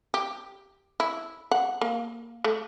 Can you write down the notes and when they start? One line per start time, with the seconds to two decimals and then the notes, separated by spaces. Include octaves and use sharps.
0.14 G4
1.00 E4
1.51 F#5
1.81 A#3
2.44 A3